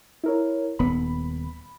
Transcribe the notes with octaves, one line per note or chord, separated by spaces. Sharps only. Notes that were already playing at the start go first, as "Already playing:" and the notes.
E4 A#4 C#5
D#1 B3 B5